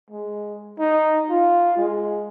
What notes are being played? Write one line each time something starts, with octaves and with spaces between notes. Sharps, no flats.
G#3
D#4
F4
G#3